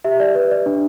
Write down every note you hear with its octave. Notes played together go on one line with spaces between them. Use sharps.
G4 E5
D5
B4
D5
D4